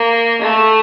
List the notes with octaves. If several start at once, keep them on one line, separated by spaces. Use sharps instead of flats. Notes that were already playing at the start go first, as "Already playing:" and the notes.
Already playing: A#3
A3